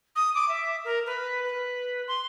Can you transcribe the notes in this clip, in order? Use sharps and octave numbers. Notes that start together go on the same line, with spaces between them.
D#6
D6
E5
A#4
B4
B4
C6